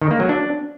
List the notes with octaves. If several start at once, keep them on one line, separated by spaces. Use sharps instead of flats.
D#3
A#3
F#3
D4